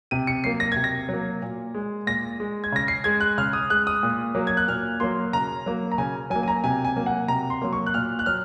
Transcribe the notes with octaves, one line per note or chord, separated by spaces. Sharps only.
C3 D#7
C#7
F#3 A#3 C7
A#6
C3 G#6
A#6
F#3 A#3
A#2
G#3
A#2 A#6
G#3
G#6
C#3 A#6
C7
G#3 G#6
F#6
C#3 F6
D#6
G#3 F#6
D#6
A#2
F#3 A#3
G#6
F#6
A#2 F6
F#3 A#3 C6
C#3 A#5
F#3 A#3
A#5
C#3 G#5
F#3 G#5
A#3
G#5
A#5
C3 G#5
G#5
F#3 A#3
F#5
C3 A#5
C6
F#3 A#3
C#6
F#6
A#2 F6
F#6
F#3 F6